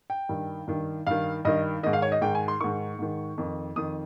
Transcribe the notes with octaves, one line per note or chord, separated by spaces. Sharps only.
G5
G2 D#3
G2 D#3
G2 D#3 F5
G2 D#3 D#5
G#2 D#3 D#5
F5
C#5
D#5
G#2 D#3 G5
G#5
C6
G#2 D#3 C#6
G#2 D#3
F2 D#3
F2 D#3 D#6